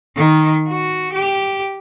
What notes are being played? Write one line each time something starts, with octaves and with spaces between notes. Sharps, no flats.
D#3
F#4
G4